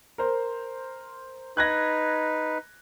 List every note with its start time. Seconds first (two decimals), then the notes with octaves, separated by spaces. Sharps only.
0.18 A#4 C5
1.57 D#4 B4 F#6 G#6 A#6